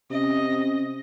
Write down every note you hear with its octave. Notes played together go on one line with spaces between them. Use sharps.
C3 C#4 D#5